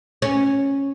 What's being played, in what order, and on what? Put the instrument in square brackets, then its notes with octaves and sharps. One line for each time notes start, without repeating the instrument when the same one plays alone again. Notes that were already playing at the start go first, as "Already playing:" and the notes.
[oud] C#4